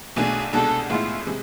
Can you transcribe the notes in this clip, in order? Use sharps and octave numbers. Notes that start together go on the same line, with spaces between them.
B1 B2 A3 D4 G#4
C2 B2 G#3 D4 A4
A2 G#3 B3 E4 F4
C3 G#3